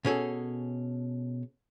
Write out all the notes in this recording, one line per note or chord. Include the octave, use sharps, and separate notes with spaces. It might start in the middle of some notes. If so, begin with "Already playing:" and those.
B2 C#4 G#4 A4